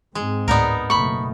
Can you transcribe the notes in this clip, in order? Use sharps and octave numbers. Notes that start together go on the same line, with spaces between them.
G#2 G#3 C4
D2 A2 B3 D#4 A#4 D5
F#1 B2 A3 B5 C#6